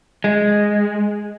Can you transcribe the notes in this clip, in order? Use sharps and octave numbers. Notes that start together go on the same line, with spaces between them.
G#3